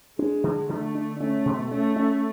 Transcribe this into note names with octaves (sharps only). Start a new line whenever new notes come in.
G#3 D4
D3
D3 A3
D4
A3 C#4
B2
A3 C#4
C#4